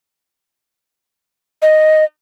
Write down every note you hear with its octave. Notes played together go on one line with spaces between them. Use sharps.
D#5